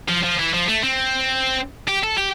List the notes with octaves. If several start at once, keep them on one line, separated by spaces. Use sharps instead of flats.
F3
F3
E3
F3
A3
C4
G4
A4
G4